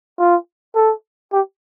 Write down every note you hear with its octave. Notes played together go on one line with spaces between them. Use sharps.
F4
A4
G4